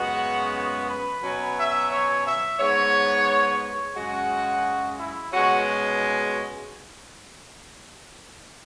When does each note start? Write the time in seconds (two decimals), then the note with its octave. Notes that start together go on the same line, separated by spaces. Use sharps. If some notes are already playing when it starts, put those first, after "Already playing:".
Already playing: F#2 C#3 G#3 B3 F#4
0.54 F#4
0.88 B4
1.22 B2 F#3 C#4
1.56 E5
1.90 C#5
2.25 E5
2.59 G#2 G#3 B3 C#5
3.62 C#5
3.96 F#2 C#3 G#3 F#4
4.99 E4
5.33 B2 G#3 C#4 F#4